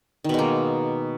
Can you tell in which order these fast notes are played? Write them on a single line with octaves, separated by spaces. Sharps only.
D#3 B2 G#3 A#3